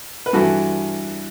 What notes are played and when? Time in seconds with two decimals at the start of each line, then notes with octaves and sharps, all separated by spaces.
0.26 B4
0.33 G2 E3 F#4 A4